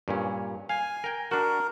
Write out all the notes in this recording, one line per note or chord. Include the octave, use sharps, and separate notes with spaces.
G2 A#2 C#4
F5 G#5
A#4 G5
D4 F#4 A#4